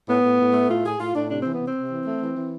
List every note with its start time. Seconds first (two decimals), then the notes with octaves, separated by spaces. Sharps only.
0.08 A2 B3
0.23 A2
0.39 A2
0.54 A3
0.69 A2 F4
0.84 A2 G#4
1.00 A2 F4
1.15 A2 D4
1.30 C3 D4
1.41 E3 C4
1.54 B3
1.61 C3 C4
1.76 C3
1.92 E3
2.06 A3
2.22 E3
2.37 E3